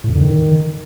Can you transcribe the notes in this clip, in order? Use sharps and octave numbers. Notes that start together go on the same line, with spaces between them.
A2
F2
D3
D#3